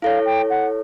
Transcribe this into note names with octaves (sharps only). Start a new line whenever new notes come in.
E4 A4 C#5 F5
G5
F#5